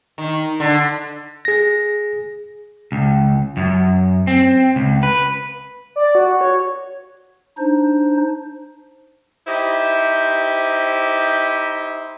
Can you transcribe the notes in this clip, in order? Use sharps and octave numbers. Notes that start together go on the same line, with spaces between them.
D#3
D3
G#4 A#6
C#2
F#2
C4
C#2
B4
D5
F#4
C#5
D4 D#4 C5
D#4 E4 G4 C5